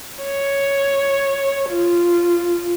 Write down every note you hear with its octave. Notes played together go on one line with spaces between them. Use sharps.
C#5
F4